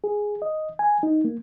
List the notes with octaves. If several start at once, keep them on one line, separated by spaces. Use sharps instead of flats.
G#4
D#5
G#5
D#4
A#3